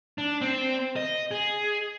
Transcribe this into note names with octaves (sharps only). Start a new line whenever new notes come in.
D4
C4
D#5
G#4